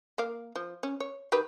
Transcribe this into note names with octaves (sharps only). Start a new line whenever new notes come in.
A#3 A#4 F5
F3
C#4
C#5
D#3 G4 B4